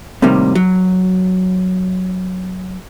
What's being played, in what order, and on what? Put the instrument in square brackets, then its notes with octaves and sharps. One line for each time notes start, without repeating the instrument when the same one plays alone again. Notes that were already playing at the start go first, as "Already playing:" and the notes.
[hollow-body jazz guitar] A2 C3 D#3 G3 A#3
F#3